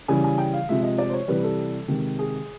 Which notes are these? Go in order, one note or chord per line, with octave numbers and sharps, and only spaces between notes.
C#3 E3 G3 G#5
G#5
G5
F5
C3 F3 G#3 E5
D#5
D5
C5
C#5
C3 E3 G3 B4
A4
C3 D#3 G#3
G#4